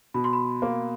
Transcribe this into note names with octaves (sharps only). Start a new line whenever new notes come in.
B2 B5
C6
B5
A#3